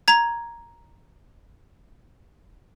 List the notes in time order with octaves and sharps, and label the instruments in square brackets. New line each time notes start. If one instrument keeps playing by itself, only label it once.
[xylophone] A#5 G#6